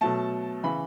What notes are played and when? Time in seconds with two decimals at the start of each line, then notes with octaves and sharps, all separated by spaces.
0.01 B2 F#3 A3 A5
0.63 C#3 E3 B5